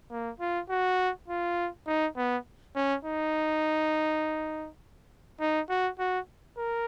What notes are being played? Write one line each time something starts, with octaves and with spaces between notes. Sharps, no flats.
A#3
F4
F#4
F4
D#4
B3
C#4
D#4
D#4
F#4
F#4
A#4